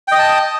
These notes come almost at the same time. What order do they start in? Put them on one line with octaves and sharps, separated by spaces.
G5 D#5 D#6 A5